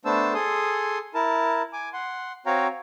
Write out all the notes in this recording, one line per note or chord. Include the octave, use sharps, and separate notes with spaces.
A3 B3 D4 C5 A5 E6
G#4 A4 C6 D#6
E4 A#4 A5
G#5 D6
F#5 C6
C4 F#4 C#5 F5 G5 A#5